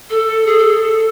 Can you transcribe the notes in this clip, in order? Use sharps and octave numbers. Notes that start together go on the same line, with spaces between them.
A4
G#4
A4